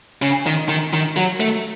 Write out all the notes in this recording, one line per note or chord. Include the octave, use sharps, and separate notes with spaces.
C#3
D#3
D#3
D#3
F#3
A3